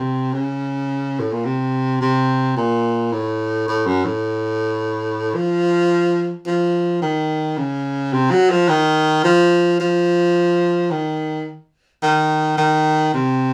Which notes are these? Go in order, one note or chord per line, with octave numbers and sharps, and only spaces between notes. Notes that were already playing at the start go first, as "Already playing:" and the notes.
Already playing: C3
C#3
A2
A#2
C3
C3
A#2
A2
A2
F#2
A2
F3
F3
D#3
C#3
C3
F#3
F3
D#3
F3
F3
D#3
D#3
D#3
C3